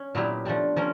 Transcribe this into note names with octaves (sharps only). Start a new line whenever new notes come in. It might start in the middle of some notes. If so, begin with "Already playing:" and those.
Already playing: C#4
A#2 F#3 B3 E4 G4
F3 A3 D4 G4
F3 A#3 C#4